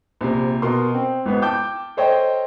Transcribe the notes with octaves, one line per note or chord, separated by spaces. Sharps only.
A#1 C3
B2 A#4 C6
C4
G#1 B3
G5 A5 D6 G6
A4 C5 C#5 D#5 G5